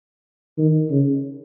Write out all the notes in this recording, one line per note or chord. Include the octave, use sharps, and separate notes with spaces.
D#3
C#3